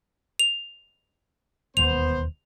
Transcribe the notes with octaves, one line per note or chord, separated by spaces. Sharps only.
F7
E1 D#2 B3 C5 F7